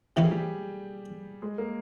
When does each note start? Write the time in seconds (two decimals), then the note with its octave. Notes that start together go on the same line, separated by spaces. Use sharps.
0.16 C3 E3 A#3 C#4 G4
0.24 G#4
0.31 G3 G4
1.42 G#3 G#4
1.58 A#3 A#4